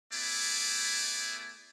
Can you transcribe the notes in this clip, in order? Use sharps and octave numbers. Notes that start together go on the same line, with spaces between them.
A3 B3 E4 G#4 D5